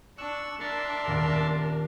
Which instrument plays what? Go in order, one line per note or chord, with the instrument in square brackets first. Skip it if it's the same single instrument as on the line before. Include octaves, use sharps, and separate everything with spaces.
[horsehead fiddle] D4 [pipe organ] C#6 E6 F#6
[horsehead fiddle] D4 A#4 [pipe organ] E5 A5 C6 [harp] C#7 D7 E7
[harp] D#1 A#2 B3